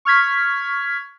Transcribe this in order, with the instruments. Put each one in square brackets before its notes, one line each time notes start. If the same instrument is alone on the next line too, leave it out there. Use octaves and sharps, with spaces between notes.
[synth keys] C#6 F6 G#6 B6